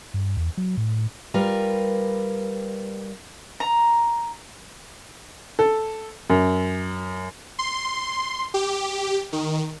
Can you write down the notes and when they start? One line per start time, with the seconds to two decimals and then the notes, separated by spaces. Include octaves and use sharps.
0.14 G2
0.37 E2
0.57 F#3
0.77 A2
1.34 G3 F4 A#4 B4
3.60 A#5
5.59 A4
6.30 F#2
7.59 C6
8.54 G4
9.33 D#3